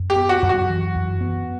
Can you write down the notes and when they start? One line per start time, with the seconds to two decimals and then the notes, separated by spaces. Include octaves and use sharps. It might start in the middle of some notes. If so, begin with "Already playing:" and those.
Already playing: F#2
0.10 G4
0.16 B3
0.29 F#4
0.42 F#2
0.49 F#4
0.69 E3
0.95 F#2
1.21 B3